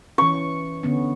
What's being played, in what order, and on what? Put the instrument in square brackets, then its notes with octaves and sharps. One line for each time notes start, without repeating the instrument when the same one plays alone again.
[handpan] E3 C#4 [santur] C#6
[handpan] D3 B3 C#4